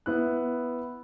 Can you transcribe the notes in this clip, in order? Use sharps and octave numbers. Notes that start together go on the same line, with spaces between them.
B3 E4 F#6